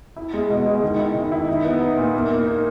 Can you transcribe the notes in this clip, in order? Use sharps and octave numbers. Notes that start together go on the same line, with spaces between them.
E4
G#3
B2
G#3
D#3
E4
D#3
E4
D#4
B3
D#4
A#2
A#3
A#3
D#4